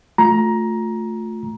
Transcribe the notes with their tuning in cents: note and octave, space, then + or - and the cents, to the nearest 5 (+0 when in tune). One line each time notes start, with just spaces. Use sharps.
A3 +0 F4 +25 A#5 +15